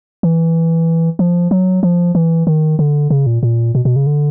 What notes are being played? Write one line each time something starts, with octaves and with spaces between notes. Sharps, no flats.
E3
F3
F#3
F3
E3
D#3
D3
C#3
A#2
A#2
B2
B2
C#3
D3